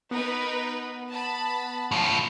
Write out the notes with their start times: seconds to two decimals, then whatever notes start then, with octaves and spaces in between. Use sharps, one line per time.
0.11 B3 D#4 A#4 B4
1.10 A5 B5
1.91 A2 F3